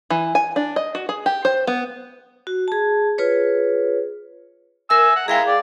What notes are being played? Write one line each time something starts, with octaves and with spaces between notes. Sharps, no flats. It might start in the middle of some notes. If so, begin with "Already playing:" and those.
E3
G#5
D4
D#5
F#4
G#4
G4
C5
B3
F#4
G#4 A5
F4 G#4 B4 C#5
A#4 E5 G#5 E6
F#5
G#3 E4 G#4 F5 G5 A#5
D5